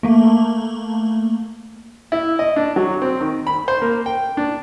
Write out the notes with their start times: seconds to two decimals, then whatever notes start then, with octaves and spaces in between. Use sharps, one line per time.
0.03 A3 A#3
2.12 E4
2.39 D#5
2.56 D4
2.76 F#3
3.02 C4
3.21 D#3
3.47 B5
3.68 C5
3.82 A#3
4.06 G5
4.37 D4